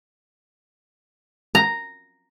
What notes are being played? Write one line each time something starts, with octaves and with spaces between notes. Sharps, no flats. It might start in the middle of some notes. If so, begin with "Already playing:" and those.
A#5